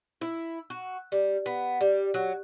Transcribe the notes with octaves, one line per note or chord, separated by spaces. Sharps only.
E4
F#4
G3
B3
G3
F#3